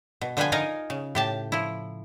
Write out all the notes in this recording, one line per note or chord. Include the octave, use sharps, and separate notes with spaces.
B2
D3 F3 F4 B4 G5 G#5
D#4 A#4 D#5 F5 G#5
C#3
A2 G4 A5
F3 E4